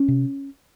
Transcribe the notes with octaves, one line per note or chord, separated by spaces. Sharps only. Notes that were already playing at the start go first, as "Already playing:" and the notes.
Already playing: C#4
C3